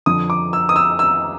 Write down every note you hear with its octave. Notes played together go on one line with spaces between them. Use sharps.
F2 D3 F3 D#6
D6
E6
D#6
E6
E6